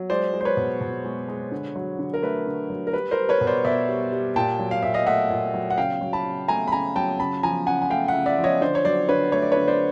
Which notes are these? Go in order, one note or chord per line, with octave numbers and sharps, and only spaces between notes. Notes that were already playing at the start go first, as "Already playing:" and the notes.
Already playing: F#3
G#3 C5 D5
G#3
C5
B4 C#5
B2
B2
G#3
G#3
D3
F#3
D3
A#4
A3 B4
D3
F#3
A#4
G3 B4
A#4 C5
G3
B4 C#5
B2
C5 D5
B2 D5 E5
G3
G3
A#2 G5 A5
F#3
F5
A#2 E5
D#5 F5
A3 E5 F#5
A#2
F#3
F#5
C#3 F5 G5
F#3
A5 B5
C#3
A3 G#5 A#5
B5
C#3 G#5 A#5
F#3 G5 A5
C#3 A5 B5
F3 G#5 A#5
C#3 F#5 G#5
G#5
A3 F5 G5
E5 F#5
C#3
D5 E5
F3
C#5 D#5
D3 C5 D5
C#5
F#3 C5 D5
D3 B4 C#5
A3 C#5
D5
D3 B4 C#5
C5 D5